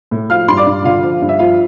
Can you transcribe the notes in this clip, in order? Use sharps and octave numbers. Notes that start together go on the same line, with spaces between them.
A2
F3 F5 F6
G2 C6
D5 D6
G2
D3 F4 F5
F3
G2
E5
F3 F4 F5